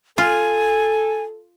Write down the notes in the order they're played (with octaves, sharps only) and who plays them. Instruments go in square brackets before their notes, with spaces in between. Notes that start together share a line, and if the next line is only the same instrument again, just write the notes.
[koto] F4 [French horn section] A4 [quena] G#5